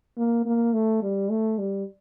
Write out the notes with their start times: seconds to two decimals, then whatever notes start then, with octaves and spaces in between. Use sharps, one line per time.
0.18 A#3
0.46 A#3
0.73 A3
1.02 G3
1.30 A3
1.58 G3